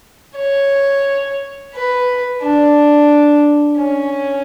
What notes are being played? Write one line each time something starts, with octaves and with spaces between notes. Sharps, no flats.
C#5
B4
D4
C#4